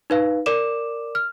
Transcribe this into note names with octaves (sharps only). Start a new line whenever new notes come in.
D#4 B4 F5
A#4 D5 D6 E7
F6